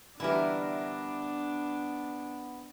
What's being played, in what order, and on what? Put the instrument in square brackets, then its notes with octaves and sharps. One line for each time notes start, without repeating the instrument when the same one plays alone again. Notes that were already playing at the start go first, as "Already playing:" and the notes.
[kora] D3 E3 G3 [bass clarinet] B3 [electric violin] D4 [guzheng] E4 A#4